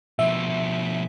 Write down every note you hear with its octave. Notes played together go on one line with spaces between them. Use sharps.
B2 F3 E5